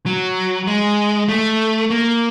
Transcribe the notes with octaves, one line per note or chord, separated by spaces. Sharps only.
F#3
G#3
A3
A#3